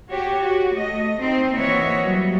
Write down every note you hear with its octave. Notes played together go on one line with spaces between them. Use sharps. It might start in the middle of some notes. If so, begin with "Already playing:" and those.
F#4 G4 C#5
F#4
A3 D#5
C4 D#4 C5
E3 A#3 F#4 C#5 D#5 E5
F#3 G3